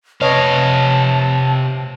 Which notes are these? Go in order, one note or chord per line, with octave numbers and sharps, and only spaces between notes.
C3 B4 C#5 D#5 F5 A5